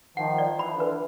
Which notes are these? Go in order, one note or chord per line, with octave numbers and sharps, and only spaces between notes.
D#3 F3 F#5
D5
E3 B5
F3
D3 E3
B4